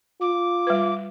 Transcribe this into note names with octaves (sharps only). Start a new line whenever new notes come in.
F4 D6
G3 B4